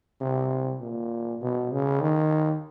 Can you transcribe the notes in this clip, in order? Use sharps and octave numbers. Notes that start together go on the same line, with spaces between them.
C3
A#2
B2
C#3
D#3